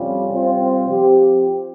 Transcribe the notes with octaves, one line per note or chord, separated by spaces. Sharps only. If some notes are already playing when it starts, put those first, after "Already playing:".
Already playing: F2 C3 G3 C#4 F4
C3 G3 C4 F4 C5
F3 C4 G4